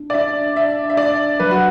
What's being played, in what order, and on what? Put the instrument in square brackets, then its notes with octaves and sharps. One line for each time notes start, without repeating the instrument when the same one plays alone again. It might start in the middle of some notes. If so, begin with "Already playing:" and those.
Already playing: [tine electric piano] D4
[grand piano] D5
[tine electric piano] D4 [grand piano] E5
[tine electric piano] D4 [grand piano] E5
[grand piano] E5
[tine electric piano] D4 [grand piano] D5
[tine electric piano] F#3 [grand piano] B4
[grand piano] F#4